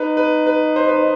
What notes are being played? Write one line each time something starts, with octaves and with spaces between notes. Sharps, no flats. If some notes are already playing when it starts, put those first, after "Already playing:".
Already playing: D#4 B4
B4
B4
C5
B4